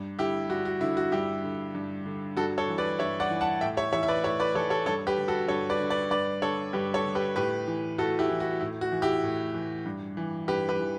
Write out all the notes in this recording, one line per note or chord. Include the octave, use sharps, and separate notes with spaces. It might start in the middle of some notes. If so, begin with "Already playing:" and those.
Already playing: G2
D3 E4 G4
G2 F#4
F#4
D3 E4
F#4
G2 E4 G4
D3
G2
D3
G2 F#4 A4
A4 C#5
E3
B4 D5
G2 C#5 E5
D5 F#5
E3
F#5 A5
A2 E5 G5
C#5 E5
E3 C#5 E5
E5
B4 D5
A2 C#5 E5
B4 D5
E3 A4 C#5
A4 C#5
G2 A4 C#5
G4 B4
D3
F#4 A4
G2 A4 C#5
B4 D5
D3
B4 D5
G2 B4 D5
D3 A4 C#5
G2 G4 B4
A4 C#5
D3
G4 B4
A2 G4 B4
E3
A2 F#4 A4
E4 G4
E3
F#4
A2 E4
F#4
E3
E4 G4
A2
E3
G2
E3
G2 G4 B4
G4 B4
E3